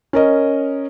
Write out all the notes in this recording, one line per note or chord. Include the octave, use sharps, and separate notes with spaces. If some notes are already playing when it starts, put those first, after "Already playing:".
C#4 A#4 D#5